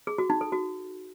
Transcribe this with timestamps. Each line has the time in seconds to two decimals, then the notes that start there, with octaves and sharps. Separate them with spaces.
0.07 G#4
0.18 F#4
0.30 D#4
0.41 A4
0.52 F#4